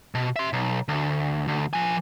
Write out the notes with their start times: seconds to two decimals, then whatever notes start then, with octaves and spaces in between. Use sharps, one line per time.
0.15 B2
0.36 E5 C6
0.53 B1
0.88 D2
1.48 D2
1.73 F3 G#5